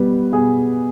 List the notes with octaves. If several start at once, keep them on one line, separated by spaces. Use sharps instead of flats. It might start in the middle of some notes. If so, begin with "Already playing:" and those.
Already playing: B2 G3 B3 B4
B2 G#4